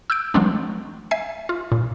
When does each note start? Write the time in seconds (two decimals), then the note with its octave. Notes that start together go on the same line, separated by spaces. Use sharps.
0.10 E6 F#6 G6 D7
0.34 E3 F#3 G#3 A3 C4 D4
1.11 E5 G#5 C7
1.49 F4
1.72 A#2